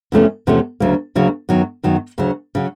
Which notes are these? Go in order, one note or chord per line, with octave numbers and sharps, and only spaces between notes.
E2 C3 F3 A3 C#4
E2 C3 F3 A3 C#4
D2 C#3 F#3 A#3
D2 C#3 F#3 A#3
F#2 D#3 F#3 B3
F#2 D#3 F#3 B3
D2 C#3 F#3
C#3 F#3